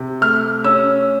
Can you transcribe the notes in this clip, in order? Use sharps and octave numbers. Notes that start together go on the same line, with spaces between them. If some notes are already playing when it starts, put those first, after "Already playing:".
Already playing: C3
A3 F6
C#4 E6